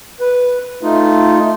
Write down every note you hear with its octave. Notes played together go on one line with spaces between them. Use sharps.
B4
A3 D#4 F4